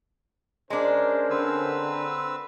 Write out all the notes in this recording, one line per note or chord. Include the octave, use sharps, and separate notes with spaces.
G#3 C#4 D4 A#4 C5
D3 C4 B4 E6